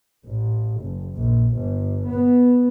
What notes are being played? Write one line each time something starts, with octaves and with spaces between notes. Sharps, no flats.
A1
F#1
A#1
G1
B3